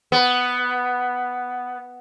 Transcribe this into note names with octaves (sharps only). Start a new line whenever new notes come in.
B3